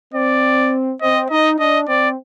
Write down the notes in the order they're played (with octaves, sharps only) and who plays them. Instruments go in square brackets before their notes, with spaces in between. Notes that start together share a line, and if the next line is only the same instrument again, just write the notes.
[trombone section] C4 [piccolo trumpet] D5
[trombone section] C4 [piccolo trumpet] D#5
[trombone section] D#4 [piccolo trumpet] D#5
[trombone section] D4 [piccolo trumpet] D#5
[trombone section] C4 [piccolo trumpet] D5